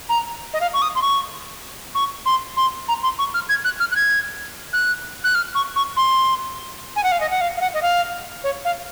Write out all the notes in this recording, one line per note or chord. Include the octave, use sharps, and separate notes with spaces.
A#5
D#5
F5
C#6
D#6
C6
C#6
C#6
C6
C6
A#5
C6
C#6
F6
G#6
F#6
F6
F#6
G#6
F#6
F#6
F6
C#6
C#6
C6
G#5
F#5
F5
D#5
F#5
F5
F5
F#5
D#5
F5
C#5
F5